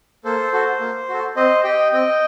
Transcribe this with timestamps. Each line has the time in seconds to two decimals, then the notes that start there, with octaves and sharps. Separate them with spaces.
0.25 A#3 A4 C5
0.53 F#4 A4
0.80 A#3
1.09 F#4 A4
1.36 C4 C5 D#5
1.64 G4 D#5 G5
1.92 C4 D#5 G5